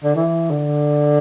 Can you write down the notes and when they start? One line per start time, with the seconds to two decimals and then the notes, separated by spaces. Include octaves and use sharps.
0.04 D3
0.16 E3
0.51 D3